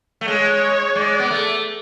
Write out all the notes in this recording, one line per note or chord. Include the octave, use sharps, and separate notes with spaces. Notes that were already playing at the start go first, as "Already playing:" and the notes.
A3
G#3 C#5
G#3 D5
B3
A3